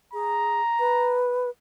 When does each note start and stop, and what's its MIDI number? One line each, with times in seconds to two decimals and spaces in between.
0.13 0.61 68
0.13 1.20 82
0.79 1.50 71